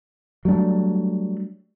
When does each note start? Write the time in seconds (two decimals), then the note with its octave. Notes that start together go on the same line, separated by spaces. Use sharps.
0.45 F#3 G3 A3 D4